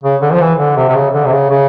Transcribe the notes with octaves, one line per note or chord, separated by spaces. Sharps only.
C#3
D3
F3
E3
D3
C3
C3
C#3
D3
C3
C#3
C#3